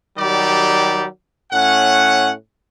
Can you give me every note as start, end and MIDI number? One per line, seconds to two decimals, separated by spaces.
0.18 1.05 51
0.18 1.05 54
0.18 1.05 55
0.18 1.05 67
0.18 1.05 74
1.52 2.32 45
1.52 2.32 61
1.52 2.32 78